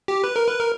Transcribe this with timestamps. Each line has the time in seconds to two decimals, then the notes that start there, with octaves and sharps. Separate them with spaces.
0.08 G4
0.24 B4
0.36 A#4
0.48 B4
0.60 A#4